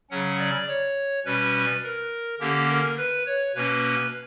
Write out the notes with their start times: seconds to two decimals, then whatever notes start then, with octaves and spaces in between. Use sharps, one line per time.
0.10 C#3 F#3 C#4 F#5
0.39 D5
0.68 C#5
1.25 B2 G3 C#4 B4
1.83 A#4
2.40 D3 A#3 C#4 G4
2.69 A#4
2.97 B4
3.26 C#5
3.55 B2 A#3 C#4 B4